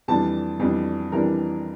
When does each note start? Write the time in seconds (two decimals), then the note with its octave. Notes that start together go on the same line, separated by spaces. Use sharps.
0.08 F2 E3 G3 D4 A5
0.60 F2 E3 G3 D4
1.12 F2 E3 G3 D4 A#4